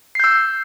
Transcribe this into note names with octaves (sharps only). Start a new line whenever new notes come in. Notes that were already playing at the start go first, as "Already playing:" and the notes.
E6 G6 C7